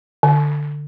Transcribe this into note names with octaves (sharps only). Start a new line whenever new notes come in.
D3